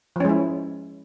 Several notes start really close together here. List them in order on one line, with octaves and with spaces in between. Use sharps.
F3 C#4 G#3 E4